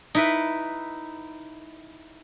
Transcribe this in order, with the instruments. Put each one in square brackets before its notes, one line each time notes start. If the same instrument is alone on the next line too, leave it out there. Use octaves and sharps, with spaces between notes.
[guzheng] D#4 E4 B4